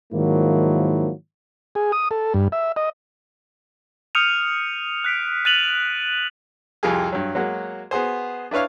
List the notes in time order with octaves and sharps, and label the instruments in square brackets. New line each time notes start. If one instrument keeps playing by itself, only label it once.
[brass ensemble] G#2 D#3 F3 F#3 A#3 E4
[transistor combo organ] G#4
D#6
A4
G2
E5
D#5
[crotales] D#6 F6 G6 C#7 D#7 F7
F#6 B6 D7
F#6 A6 D#7 F7 F#7
[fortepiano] C2 F2 F4 G4 G#4
G2 F#3
F#3 G#3 A#3 F#4
B3 F#4 G#4 C5
D4 E4 B4 C#5 F5